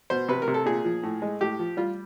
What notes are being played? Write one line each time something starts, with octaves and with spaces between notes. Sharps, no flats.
B2 C5
C3 B4
A#4
C3
A4
A#2 G#4
F3
A2
G#3
A2 G4
F3
G3 F4